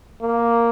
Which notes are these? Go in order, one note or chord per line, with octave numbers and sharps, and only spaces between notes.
A#3